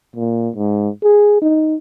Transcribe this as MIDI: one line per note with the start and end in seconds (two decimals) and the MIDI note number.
0.16 0.49 46
0.56 0.89 44
1.03 1.38 68
1.42 1.75 63